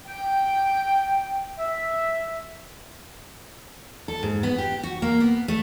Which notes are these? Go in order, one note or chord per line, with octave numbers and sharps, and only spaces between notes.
G5
E5
A4
G#2
B3
G4
F#4
A#3
B3
A3